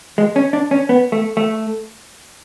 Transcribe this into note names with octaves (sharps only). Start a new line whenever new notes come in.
G#3
C#4
D4
C#4
B3
A3
A3